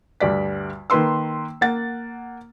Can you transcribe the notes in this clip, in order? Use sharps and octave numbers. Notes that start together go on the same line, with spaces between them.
D2 G2 D5 B6
D#3 A#3 B4 C6 E6
A#3 F#5 A6